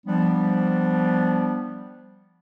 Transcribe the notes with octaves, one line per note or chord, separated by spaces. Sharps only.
F3 G3 B3 D4